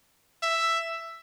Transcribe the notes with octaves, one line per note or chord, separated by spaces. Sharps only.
E5